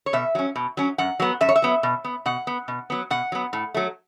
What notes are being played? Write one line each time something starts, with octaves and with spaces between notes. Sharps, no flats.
C#5
B2 E5
F#3 C#4
B2
F#3 C#4
F#2 F#5
F#3 B3
F#2 E5
C#5
E5
F#3 B3
B2
B3
B2 F#5
B3
B2
F#3 B3
B2 F#5
F#3 B3
A2
F#3 A3